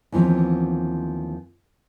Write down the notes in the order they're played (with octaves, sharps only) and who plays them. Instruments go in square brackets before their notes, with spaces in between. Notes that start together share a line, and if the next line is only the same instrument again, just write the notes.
[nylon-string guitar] D#2 E3 F3 B3 C4